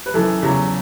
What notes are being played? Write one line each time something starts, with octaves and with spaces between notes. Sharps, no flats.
B4
F#2 E3 A4
E2 C#3 F#3